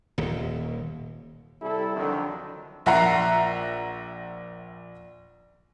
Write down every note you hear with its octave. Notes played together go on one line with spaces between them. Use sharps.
D#1 D#2
C3 G3 E4 A4
F2 D3 D#3 F#3 D4
A#1 E5 F#5 A#5 C7